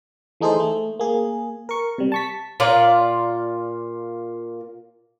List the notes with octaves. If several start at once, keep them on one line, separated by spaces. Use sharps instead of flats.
E3 A3 D#4 G#4 A4 C5
A3
A#3 G#4
A#4 C#6
C3 G3
A5 C#6 B6
A#2 F4 D5